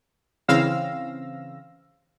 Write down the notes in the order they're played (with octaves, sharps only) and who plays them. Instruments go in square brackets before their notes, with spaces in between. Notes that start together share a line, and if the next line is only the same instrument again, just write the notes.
[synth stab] C#3 E3 C4 F5 E6 A#6